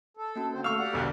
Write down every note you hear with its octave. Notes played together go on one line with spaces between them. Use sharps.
A4
A#3 C#4 F#4
D3 C4 C5
A3 F5 C#6 E6
G4 D5 F#5
E1 B1 D3 A4 E6